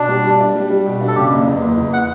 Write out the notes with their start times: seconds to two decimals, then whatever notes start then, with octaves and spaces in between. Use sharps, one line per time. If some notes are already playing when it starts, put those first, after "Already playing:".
Already playing: B2 D4
0.09 G3
0.24 G3
0.40 D4
0.55 G3
0.70 G3
0.86 B2
1.01 D4
1.08 A4
1.16 C#3 G4
1.31 F#1
1.47 E2
1.62 F#1
1.77 E2
1.93 F#5